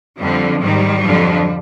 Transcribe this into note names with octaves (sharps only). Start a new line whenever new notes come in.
F2 D3 F3 G3
G#2 D#3 G3
F2 D3 F3